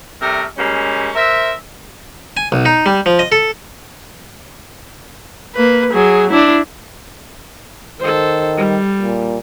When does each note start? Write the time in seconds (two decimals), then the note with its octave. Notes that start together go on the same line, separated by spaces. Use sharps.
0.22 C3 G3 A3 A4 A#4
0.58 G3 G#3 A#3 C#4
1.16 A#4 C5 E5
2.37 G#5
2.52 B1
2.65 D#4
2.86 G3
3.06 F3
3.19 D#5
3.32 A4
5.56 A#3 B4
5.92 F#3 G#4
6.30 D4 E4
8.00 D#3 A4 C5
8.57 G3
9.01 A#2